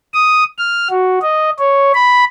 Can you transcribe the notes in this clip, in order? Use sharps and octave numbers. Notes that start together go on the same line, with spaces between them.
D#6
F6
F#4
D#5
C#5
B5